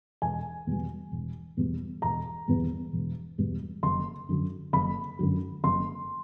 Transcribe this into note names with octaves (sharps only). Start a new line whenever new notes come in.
E1 G#5
E2 B2 G3
E1
E2 B2 G3
E1 A#5
E2 B2 G3
E1
E2 B2 G3
F#1 C6
F#2 D3 F#3
F#1 B5
F#2 D3 F#3
F#1 C6